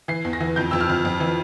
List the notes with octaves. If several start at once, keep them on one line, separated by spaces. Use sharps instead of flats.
E3 C7
E2
A#6
E3
F2 G6
F2 E6
F6
F2
F2
E3